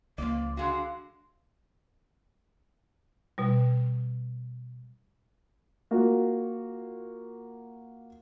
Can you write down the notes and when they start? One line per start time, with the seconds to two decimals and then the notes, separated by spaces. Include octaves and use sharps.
0.18 C#2 F3 A#3 D5
0.57 D3 G#3 F#4 F5
3.38 B2 G3
5.91 A#3 F4 F#4